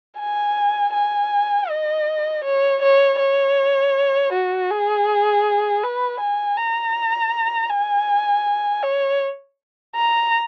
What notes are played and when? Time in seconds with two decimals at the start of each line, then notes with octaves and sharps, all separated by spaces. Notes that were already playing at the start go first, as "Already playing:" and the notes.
0.19 G#5
0.94 G#5
1.69 D#5
2.44 C#5
2.83 C#5
3.19 C#5
4.33 F#4
4.70 G#4
5.83 B4
6.20 G#5
6.57 A#5
7.70 G#5
8.82 C#5
9.96 A#5